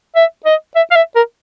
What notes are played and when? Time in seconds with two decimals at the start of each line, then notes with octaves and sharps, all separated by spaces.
0.16 E5
0.45 D#5
0.76 E5
0.91 F5
0.96 E5
1.16 A#4